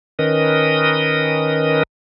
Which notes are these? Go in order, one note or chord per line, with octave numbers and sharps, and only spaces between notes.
D#3 C#4 A#4 B4 D#5 D#6